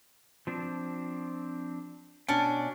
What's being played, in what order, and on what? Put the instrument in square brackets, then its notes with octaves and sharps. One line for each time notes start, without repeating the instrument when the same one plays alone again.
[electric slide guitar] F3 C4 D4
[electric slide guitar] B2 G5 [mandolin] C#4 D4